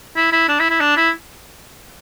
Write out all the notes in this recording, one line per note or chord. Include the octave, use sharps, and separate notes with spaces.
E4
E4
D4
E4
E4
D4
E4